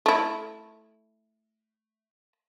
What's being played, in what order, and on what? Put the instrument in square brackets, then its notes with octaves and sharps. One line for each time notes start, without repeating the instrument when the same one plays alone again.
[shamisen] A3 E4